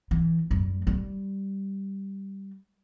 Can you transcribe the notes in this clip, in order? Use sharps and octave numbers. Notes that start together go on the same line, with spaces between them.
E3
F#2 G3
G3